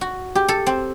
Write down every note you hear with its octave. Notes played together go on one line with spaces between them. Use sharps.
F#4
G4
A4
C4